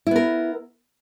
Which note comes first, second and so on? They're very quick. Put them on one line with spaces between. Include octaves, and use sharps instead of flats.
E4 B3 A#4